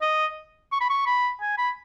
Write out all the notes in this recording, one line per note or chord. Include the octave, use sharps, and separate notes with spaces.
D#5
C#6
B5
C#6
B5
G#5
B5